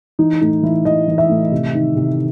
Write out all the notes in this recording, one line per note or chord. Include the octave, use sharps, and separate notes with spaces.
E3 D#4
A2 D#4
E3 E4
E3 D#5
E3
E5
A2
C3
D#3
C3